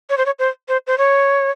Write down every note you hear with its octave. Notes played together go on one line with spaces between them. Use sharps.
C#5
C5
C#5
C5
C5
C5
C#5